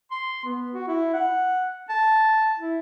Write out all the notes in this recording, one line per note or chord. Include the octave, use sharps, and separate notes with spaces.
C6
B3
F#4
E4
F#5
A5
E4